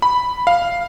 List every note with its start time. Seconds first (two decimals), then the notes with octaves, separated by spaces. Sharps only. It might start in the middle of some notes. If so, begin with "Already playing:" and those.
0.02 B5
0.47 F5